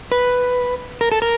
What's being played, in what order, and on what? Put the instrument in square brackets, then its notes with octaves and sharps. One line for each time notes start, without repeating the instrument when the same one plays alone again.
[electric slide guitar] B4
A#4
A4
A#4